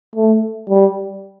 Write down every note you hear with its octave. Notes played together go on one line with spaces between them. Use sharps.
A3
G3